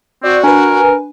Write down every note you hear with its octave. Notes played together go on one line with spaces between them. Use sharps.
C4 F#4 D5
D4 A#4 B4 G#5